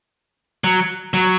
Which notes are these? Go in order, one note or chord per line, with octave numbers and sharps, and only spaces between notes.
F#3
F#3